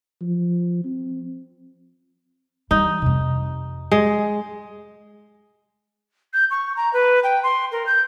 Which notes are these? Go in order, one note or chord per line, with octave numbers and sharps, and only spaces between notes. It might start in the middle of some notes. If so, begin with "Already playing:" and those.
F3
C4
E3 G3 D#4
F2 C3
G#3
G6
C#6
A#5
B4
G5
C6
A#4
G6